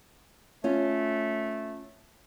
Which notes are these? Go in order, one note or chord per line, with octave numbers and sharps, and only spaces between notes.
A3 C#4 F4